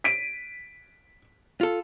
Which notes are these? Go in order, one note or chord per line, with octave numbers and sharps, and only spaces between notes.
B6 D7 D#7
F4 A4